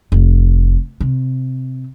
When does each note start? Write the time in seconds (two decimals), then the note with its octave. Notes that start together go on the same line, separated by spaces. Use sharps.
0.12 F1
1.01 C3